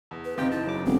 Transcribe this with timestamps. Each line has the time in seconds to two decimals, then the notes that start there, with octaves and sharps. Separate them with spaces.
0.11 E2
0.25 B4
0.38 F#1 C4 D#4 F4 G4 G5 A#5
0.52 E4 A5
0.67 F#2 C#3 D6
0.86 E1 C4 G#4